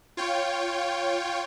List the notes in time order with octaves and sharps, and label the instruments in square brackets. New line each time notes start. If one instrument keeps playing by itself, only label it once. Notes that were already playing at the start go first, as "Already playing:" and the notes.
[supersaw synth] F4 C#5 G5